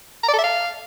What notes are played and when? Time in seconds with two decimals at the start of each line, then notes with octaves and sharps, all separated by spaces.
0.23 A#5
0.28 D5
0.33 A4
0.39 E5
0.44 F5